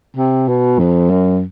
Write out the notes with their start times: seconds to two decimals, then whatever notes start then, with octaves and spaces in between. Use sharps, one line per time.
0.17 C3
0.48 B2
0.79 F2
1.10 F#2